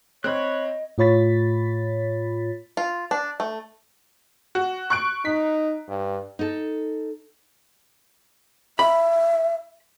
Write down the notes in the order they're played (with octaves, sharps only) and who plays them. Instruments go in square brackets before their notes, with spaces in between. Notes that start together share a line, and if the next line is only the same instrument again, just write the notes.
[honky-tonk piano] C4 [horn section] C#5 [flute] D#5 [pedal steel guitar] B5 F#6
[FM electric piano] A2 F4 C#5 B5 A6 B6
[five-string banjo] F4
D4
A3
[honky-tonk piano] F#4
C#6 F#6 D7
[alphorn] D#4 [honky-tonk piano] B6
[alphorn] G2
[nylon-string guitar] D#4 A4
[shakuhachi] E5 [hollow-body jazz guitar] B5